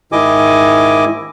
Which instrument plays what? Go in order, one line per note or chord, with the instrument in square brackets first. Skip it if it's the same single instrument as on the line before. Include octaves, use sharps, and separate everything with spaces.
[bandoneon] G#2 D#3 E4 D#5 G#5 D6